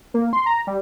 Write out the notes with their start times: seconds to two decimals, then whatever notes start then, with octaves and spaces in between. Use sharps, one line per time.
0.14 A#3
0.33 C6
0.46 A#5
0.67 G3